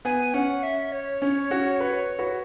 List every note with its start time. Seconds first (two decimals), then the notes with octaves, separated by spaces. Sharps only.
0.05 B3 G#5
0.34 C#4 F#5
0.63 E5
0.92 C#5
1.22 C#4
1.50 C#4 F#4
1.80 F#4 B4
2.19 F#4 B4